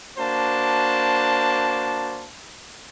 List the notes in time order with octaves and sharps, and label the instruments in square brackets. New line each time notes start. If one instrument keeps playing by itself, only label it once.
[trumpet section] A#3 D4 F#4 C5 A5